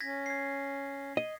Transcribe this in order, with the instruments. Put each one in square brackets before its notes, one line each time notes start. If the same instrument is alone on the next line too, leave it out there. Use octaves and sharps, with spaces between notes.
[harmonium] C#4 [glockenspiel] G#6 A#6 B6
[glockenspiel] G#6 C7
[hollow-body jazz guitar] D#5